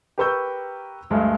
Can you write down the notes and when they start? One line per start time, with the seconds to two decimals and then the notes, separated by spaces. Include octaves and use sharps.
0.18 G4 A#4 B4 C#6 E6 G6
1.10 D2 G2 G#3 A3